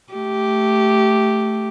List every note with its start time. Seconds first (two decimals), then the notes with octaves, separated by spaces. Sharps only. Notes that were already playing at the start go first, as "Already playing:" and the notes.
0.14 A3 G4